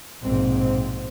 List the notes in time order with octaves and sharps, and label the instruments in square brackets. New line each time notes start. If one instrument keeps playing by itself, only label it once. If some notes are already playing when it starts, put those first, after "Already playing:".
[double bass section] A#1 G#2 B2 C4